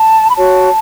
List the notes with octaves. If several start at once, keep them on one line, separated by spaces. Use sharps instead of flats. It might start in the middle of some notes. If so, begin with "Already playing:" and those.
Already playing: A5
B5
F#4 C#5 A5